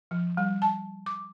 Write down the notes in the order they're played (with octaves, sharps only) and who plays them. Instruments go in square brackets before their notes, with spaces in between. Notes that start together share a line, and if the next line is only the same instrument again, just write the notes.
[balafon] F3
G3
A5
D6